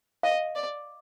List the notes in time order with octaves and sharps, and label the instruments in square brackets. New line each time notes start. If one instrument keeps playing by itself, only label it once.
[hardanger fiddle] D#5 [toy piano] F5
[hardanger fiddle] D5